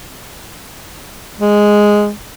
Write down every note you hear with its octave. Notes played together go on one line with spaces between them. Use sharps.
G#3